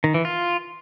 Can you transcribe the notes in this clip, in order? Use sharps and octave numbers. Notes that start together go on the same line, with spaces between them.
D#3
E3
F4